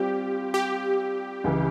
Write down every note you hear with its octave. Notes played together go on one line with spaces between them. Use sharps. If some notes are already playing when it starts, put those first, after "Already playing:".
Already playing: G3 C4 F4 G4
G4
C#2 C#3 E3